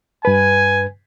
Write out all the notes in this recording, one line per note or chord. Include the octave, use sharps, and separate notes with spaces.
G2 B4 G#5